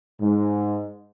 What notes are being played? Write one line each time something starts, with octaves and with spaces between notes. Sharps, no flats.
G#2